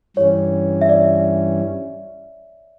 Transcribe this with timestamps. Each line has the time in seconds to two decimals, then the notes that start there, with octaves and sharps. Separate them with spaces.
0.17 G2 E3 G3 C#4 C#5
0.81 E5
0.89 D5